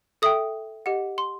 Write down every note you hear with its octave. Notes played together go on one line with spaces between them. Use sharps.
A4 E5 G5 D#6
G4 D#5 F#5
C6